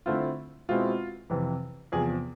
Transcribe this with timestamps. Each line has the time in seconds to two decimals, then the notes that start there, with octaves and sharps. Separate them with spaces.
0.06 D3 A3 C4 E4 F4
0.69 B2 G#3 C4 E4 F4
1.30 F2 C3 E3
1.92 E2 C3 F3 G#4